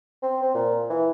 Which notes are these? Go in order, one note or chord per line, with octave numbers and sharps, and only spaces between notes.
C4
C4
A#2
E3